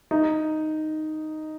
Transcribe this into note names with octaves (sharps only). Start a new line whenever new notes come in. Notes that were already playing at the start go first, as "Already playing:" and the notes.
D#4